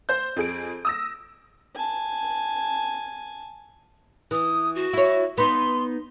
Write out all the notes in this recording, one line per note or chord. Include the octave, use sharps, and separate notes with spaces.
C5 G6
F2 G#4 D7
D#6 E6 A#6
G#5 A5
E3 D#6
F#4
E4 C#5
B3 D#4 C6